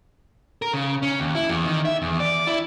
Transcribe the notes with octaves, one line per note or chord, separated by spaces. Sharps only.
A#4
C#3
C#4
D#2
E4
E2
D#3
E5
E2
D5
E4